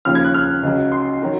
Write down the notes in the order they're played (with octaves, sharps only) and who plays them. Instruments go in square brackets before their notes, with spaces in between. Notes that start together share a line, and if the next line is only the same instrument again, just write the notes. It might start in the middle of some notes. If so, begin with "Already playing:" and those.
[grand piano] D#2 C#3 F3 F6
G#6
F#6
F6
C#2 C#3 F#3
C6
D#3 F#3